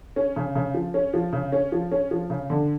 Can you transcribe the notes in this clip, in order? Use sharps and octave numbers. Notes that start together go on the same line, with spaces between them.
C#4
C#3
C#3
F3
C#4
F3
C#3
C#4
F3
C#4
F3
C#3
D3